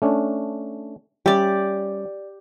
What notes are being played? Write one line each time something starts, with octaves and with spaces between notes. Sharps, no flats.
A3 C#4 D4
G3 C#4 G4 D5 E5